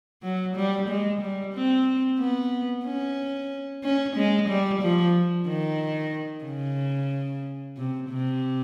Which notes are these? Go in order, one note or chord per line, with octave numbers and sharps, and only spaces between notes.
F#3
G3
G#3
G3
C4
B3
C#4
C#4
G#3
G3
F3
D#3
C#3
C3
C3